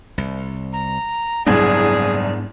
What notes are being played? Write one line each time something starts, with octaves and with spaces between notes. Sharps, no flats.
C2
A#5
F#1 C2 G#2 B3 D4 G#4 D5 G#6